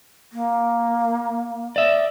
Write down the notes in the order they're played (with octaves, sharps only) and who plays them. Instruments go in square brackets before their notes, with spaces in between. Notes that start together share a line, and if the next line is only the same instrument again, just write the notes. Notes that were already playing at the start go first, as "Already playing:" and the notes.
[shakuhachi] A#3
[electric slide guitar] D5 E5